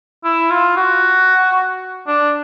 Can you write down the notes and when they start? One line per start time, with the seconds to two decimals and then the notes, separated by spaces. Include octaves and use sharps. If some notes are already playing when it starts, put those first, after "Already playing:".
0.24 E4
0.51 F4
0.77 F#4
2.07 D4